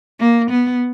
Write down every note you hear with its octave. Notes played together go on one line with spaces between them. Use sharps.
A#3
B3